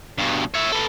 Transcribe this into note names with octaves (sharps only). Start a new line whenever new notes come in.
G2 B2
C#5 E5
A4 B4